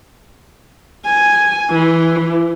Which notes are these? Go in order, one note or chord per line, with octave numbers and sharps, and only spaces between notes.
G#5
E3